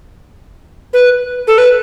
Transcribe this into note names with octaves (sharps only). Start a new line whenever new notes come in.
B4
A4
B4